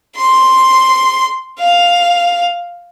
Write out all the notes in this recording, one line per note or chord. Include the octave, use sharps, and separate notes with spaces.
C6
F5